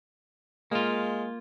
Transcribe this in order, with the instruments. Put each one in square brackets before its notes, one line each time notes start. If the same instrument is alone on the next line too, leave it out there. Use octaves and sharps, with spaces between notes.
[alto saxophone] G#3 [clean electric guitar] A#3 F4